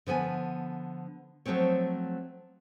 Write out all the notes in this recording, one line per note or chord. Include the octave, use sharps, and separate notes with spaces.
D3 F3 B3 G#5
F3 F#3 A3 C4 C#5